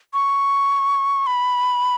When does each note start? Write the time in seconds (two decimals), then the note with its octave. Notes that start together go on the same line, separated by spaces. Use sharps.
0.14 C#6
1.27 B5